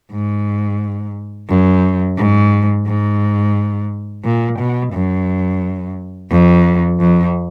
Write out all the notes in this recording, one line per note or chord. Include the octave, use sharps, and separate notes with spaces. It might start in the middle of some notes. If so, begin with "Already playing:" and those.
G#2
F#2
G#2
G#2
A#2
B2
F#2
F2
F2